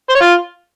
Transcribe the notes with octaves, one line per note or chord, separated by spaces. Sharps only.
C5
C#5
F4